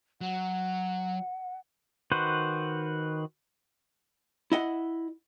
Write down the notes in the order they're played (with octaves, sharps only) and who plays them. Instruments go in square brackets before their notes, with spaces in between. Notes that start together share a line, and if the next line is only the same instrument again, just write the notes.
[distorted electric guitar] F#3 [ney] F#5
[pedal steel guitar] D#3 F#4 B4 C5
[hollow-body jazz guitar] E4 D#5 F#5